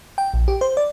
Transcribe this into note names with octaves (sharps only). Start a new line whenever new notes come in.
G5
A#1
G4
C5
D5